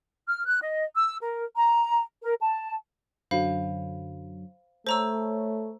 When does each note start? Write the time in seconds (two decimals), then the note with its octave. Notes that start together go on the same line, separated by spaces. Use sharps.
0.27 F6
0.46 F#6
0.62 D#5
0.95 E6
1.21 A#4
1.55 A#5
2.22 A#4
2.40 A5
3.31 F#2 D3 F#3 C5 F5 B5
4.87 A3 A4 C5 C#5 A#5 E6